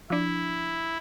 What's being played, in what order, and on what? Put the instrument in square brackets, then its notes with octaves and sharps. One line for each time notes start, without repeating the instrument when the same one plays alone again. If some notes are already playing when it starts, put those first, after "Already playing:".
[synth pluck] F3 D4 [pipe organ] E4